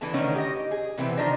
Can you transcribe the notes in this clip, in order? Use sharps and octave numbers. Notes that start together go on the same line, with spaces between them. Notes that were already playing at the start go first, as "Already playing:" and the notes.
D3 E3 B3 A5
D3 D#3 A3 B3 C#4 D#4
G4 D#5
G#4
C3 E3 B3 C4
D#3 F3 D4 D#4